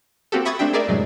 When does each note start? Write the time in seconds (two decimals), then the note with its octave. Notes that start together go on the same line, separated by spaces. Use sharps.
0.32 A#3 C4 F#4 G4 A4
0.45 E5 B5 C#6 D#6 G#6 A6
0.59 A3 C4 D4 E5 G5
0.73 G#4 A#4 D5 E5
0.88 F#2 A2 C3 F#3 G#3